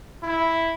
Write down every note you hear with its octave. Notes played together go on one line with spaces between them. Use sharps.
E4